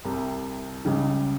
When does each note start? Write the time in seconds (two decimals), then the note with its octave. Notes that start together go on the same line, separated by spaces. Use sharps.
0.05 C2 C3 G3
0.85 C#2 C#3 G3